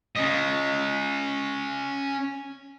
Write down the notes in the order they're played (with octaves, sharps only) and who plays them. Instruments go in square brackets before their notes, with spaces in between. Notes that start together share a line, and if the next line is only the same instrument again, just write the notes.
[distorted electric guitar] C#4 D#5